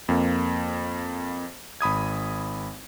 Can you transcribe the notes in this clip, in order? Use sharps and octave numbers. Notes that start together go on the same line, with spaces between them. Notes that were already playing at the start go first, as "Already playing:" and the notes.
F2 A#3
G#1 B5 D#6 G#6